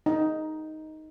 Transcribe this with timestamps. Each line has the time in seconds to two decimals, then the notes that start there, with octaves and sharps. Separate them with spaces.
0.06 D#4